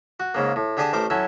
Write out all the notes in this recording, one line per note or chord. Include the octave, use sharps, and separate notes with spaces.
F#4
G#2 C#3 A#3
A2
D3 G4 G#4 D5 A5 D#6
A1 A3 A#4 C5 D6
F#3 C#4 E4 A4